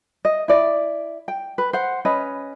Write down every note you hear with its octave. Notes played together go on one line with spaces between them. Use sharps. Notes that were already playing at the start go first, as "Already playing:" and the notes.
D#5
E4 D5
G5
B4
C5 F#5
C#4 B4 D#5